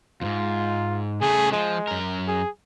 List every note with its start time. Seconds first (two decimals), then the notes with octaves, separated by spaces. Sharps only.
0.21 F2 G#2 F4
1.21 C#3 A3 G#4
1.52 F3 G#3
1.87 F#2 A#4
2.28 G#4